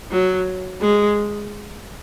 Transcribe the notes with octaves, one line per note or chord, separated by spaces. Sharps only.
F#3
G#3